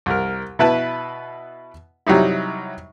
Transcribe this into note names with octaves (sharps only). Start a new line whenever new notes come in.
C2 A#4
B2 E4 B4 A5
C3 F#3 G3 D#4 E4